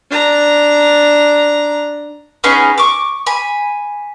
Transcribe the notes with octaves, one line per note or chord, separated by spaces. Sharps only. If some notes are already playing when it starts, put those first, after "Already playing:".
D4 A#5
B3 C#4 D#4 G#4
C#6 D6
G#5 B5